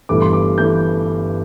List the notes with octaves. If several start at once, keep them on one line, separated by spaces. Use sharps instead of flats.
G1 G2 E3 A3 D6
C6
D6
E3 A3 G6